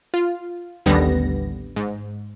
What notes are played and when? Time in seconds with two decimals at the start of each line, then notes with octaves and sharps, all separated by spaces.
0.14 F4
0.86 A1 D#2 D3 G3 B3 A#6
1.76 G#2